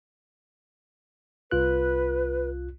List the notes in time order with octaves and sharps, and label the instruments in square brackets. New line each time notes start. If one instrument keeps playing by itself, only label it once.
[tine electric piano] C2 F4 F#6 [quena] B4